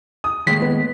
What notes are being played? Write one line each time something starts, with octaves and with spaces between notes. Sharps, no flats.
D#6
D#2 A2 G#3 B6
B3 B4